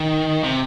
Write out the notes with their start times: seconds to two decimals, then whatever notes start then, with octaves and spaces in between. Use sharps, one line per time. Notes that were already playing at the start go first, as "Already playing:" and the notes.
Already playing: D#3
0.44 C3